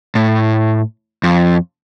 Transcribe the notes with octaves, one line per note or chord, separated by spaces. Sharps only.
A2
F2